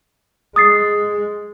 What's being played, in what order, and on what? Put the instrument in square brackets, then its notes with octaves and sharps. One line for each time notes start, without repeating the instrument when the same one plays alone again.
[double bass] G#3 [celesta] D#6 A6 C7